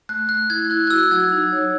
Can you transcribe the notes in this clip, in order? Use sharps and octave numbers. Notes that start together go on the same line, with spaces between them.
A3 F#6
A3 F#6
E4 G#6
E4 F#6
F#6
F#4 E6
F#3 G#6
D#4
C#5